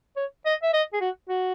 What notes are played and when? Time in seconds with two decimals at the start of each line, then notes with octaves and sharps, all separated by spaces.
0.17 C#5
0.46 D#5
0.63 E5
0.74 D#5
0.93 G#4
1.01 F#4
1.29 F#4